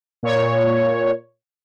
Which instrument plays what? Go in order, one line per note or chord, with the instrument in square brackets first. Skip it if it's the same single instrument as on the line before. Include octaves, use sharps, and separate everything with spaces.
[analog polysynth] A#2 C#5